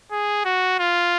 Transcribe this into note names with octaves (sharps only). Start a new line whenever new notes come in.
G#4
F#4
F4